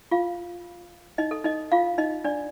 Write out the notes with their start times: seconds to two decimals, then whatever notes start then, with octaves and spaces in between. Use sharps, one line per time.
0.11 F4 F5
1.18 D#4 D#5
1.31 A4
1.44 D#4 D#5
1.72 F4 F5
1.98 D#4 D#5
2.24 D4 D5